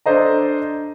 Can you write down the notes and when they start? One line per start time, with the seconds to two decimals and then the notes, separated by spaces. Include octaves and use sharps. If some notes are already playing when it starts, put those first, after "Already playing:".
0.06 D4 A4 C5 D#5 A#5